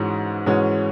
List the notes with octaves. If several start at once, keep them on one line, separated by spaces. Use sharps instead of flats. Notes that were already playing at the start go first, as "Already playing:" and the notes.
Already playing: G#2 E3 G#3 C#4 F#4
G#2 E3 G#3 C#4 F#4